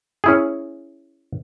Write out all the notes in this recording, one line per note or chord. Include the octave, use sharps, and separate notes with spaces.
C#4 E4 G#4